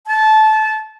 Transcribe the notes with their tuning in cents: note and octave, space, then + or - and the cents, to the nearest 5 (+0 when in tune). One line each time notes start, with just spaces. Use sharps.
A5 -20